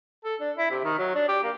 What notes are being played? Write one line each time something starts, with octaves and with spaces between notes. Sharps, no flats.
A4
D4
E4
C3
D#3
F#3
D4
G4
A#3